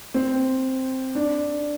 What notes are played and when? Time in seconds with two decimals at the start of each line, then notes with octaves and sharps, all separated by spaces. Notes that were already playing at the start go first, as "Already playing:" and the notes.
0.14 C4
1.15 D4